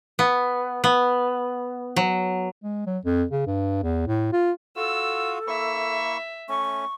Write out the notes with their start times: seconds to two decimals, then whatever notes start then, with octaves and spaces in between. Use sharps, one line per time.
0.19 B3
0.84 B3
1.96 F#3
2.63 G#3
2.86 F#3
3.05 F2
3.31 C#3
3.47 G2
3.83 E2
4.07 A2
4.33 F4
4.76 F4 F#4 A4 E6
5.48 A#3 E4 E5 C#6
6.49 A3 C#4 C#6